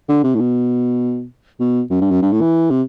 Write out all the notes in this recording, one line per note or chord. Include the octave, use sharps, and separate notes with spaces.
D3
C3
A2
B2
B2
F#2
G2
F#2
G2
A2
E3
C3